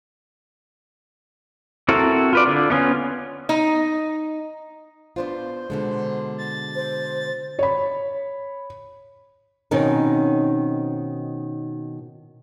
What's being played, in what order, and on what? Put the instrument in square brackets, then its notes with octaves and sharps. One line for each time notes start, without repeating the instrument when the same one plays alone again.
[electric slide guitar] C4 E4 F#4 A4 A#4
F4 B4 D5
D3 F4
A3 B3 C#4 F4
[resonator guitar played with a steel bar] D#4
[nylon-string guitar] B3 D4 F4 [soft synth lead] C5
[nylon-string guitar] B2 D3 G#3
[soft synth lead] A6
[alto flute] C5
[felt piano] C#5 B5
[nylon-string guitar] B2 D#3 C4 C#4 D#4